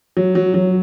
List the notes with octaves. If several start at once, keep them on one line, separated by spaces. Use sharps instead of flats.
F#3
F#3
F#3